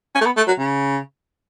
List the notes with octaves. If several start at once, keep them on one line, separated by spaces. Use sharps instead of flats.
C#4
A3
B3
A3
F#3
C#3